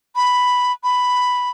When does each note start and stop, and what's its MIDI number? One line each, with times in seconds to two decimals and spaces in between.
0.16 0.72 83
0.84 1.50 83